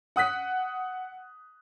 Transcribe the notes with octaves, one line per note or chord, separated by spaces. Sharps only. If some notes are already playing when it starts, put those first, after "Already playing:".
F#5 D#6 F#6 B6